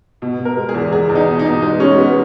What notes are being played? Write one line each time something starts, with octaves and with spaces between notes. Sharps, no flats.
B2
B2
A#4
G#3
G#4
E2
E2 G#4
E2
D#4
B2
D#4
B2
G#3 D#4
G#3 C#4
G#3 B3